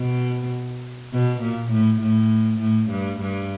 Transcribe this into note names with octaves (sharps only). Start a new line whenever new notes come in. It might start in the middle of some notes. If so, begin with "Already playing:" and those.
Already playing: B2
B2
A#2
A2
A2
A2
G2
G2